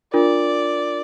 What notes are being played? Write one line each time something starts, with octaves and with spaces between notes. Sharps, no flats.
D4 F4 A#4 D5